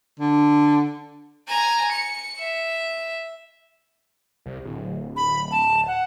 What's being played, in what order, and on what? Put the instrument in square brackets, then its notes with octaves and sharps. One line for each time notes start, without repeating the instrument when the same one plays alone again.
[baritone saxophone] D3
[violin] G#5 A#5
C#7
E5
[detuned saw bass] C2
D1
[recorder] B5
A5
F#5